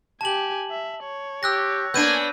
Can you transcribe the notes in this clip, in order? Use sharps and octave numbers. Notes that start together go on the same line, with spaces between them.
G4 G#5 A5 F#7
E5
C#5
G4 E6 F#6 A#6
A#3 B3 D4 G#5 G6 D#7